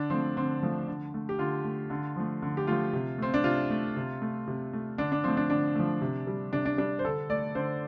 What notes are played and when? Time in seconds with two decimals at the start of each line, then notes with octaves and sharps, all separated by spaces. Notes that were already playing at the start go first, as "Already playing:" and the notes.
Already playing: D3 D4
0.10 F3 A3 C4
0.37 D3 C4
0.63 F3 A3
0.87 D3
1.14 A3
1.29 G4
1.39 D3 F4
1.65 A3
1.90 D3
2.16 F3 A3
2.42 D3
2.57 G4
2.67 F3 A3 F4
2.93 C3
3.18 A3 C4
3.34 D4
3.44 C3 F4
3.70 A3
3.97 C3
4.22 A3
4.47 C3
4.73 A3
4.98 D3 D4
5.12 D4
5.24 F3 A3 C4
5.37 D4
5.50 D3 D4
5.75 F3 A3
6.02 C3
6.27 G3
6.53 C3 D4
6.65 D4
6.78 G3 D4
6.99 C5
7.04 D3 A4
7.30 A3 D5
7.55 D3 C5